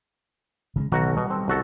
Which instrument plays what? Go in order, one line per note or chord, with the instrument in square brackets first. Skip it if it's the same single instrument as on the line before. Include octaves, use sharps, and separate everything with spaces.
[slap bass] C#3 G3 G#3
[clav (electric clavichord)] B1 F#4 A#5 [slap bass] D#3
[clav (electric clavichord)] B2 [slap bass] G3
[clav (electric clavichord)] C4 A4
C2 F#4 A4